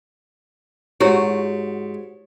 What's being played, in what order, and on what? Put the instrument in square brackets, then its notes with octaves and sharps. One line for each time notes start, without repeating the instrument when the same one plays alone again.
[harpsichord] G#2 [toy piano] E4 G4 C#5 [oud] F#4